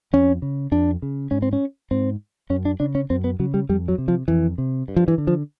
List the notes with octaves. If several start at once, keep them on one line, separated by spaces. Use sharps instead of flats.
F2 C#4
C#3
F2 D4
C#3
G#2 C#4
C4
C#4
G#2 C4
F#2 C#4
D4
C#3 D4
C#4
F#2 C4
B3
C#3 F#3
G3
F2 G3
F#3
C3
F3
F2 E3
C3
G2
F3
E3
D3
F3